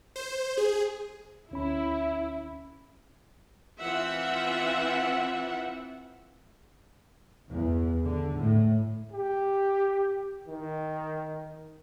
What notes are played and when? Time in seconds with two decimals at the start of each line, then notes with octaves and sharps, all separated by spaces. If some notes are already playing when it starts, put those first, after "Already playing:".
0.16 C5
0.57 G#4
1.51 D2 C#4 E4 B5
3.79 E3 C4 F4 E5 F#5
7.51 E2
8.05 D3
8.39 A2
9.12 G4
10.47 D#3